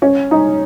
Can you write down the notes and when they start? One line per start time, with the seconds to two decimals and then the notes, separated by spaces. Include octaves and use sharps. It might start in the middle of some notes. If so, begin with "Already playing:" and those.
0.02 C#4
0.31 D#4